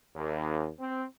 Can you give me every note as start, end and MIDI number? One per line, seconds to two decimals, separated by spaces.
0.15 0.69 39
0.79 1.03 60